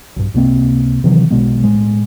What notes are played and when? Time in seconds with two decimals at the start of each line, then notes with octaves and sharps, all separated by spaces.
0.16 B1 G2
0.34 C#2 C3 A#3 C4
1.04 C3 D#3 E3 F#3
1.30 B1 B2 G#3 B3
1.64 A2 G#3